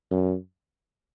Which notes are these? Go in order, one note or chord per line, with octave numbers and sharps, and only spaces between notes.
F#2